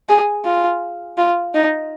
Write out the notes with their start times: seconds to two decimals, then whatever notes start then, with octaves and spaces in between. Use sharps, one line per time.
0.09 G#4
0.45 F4
1.18 F4
1.54 D#4